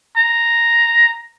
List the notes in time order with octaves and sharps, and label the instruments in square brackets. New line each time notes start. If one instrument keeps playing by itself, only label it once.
[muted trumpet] A#5